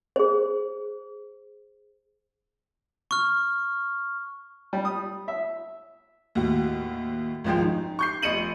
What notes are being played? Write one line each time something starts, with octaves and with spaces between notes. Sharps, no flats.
G#4 C5
C#6 F6
G3
D#6
E5
D#2 A2 F#4
G#1 C#2 F3 G#3 G5
D#4
C#6 G6 C7
F1 D#5 C#7 D#7 F#7